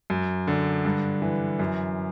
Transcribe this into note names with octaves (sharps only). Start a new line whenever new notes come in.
F#2
D3
G2
E3
F#2